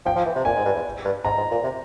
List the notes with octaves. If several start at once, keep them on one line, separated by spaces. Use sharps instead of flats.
F3 G5
F3
E3
C3
A#2 G#5
G#2
G2
E2
G2
G#2 A#5
G#2
A#2
C3